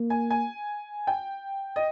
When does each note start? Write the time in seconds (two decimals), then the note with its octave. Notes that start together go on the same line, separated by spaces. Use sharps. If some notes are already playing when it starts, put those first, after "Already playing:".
Already playing: A#3
0.10 G#5
0.30 G#5
1.07 G5
1.76 D#5